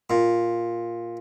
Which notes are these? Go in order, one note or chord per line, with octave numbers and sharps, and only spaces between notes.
A#2